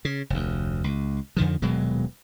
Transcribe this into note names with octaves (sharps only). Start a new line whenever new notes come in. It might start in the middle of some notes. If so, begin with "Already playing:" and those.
C#3
F1 D2
C#2
F2 D3 D#3 F3
D#1 B2 F#3 G#3